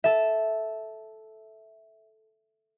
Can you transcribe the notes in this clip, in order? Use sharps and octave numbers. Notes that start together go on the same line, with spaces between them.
A4 E5